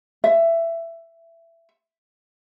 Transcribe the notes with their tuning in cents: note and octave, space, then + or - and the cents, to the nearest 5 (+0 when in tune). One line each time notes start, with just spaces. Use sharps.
E5 +15